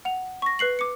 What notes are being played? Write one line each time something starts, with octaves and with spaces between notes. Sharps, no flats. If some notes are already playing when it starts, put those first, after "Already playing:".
F#5 F7
C#6 A#6
B4 F#6 C7 F#7
D6 C#7